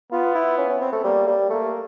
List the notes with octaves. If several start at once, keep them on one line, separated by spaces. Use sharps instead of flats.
B3 F4
E4
C#4
C#4
C4
A3
G3 A#3
G3
A3 A#3